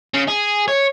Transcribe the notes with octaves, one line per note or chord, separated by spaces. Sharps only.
C#3
G#4
C#5